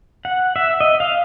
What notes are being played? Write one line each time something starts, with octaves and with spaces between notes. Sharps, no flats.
F#5
E5
D#5
F5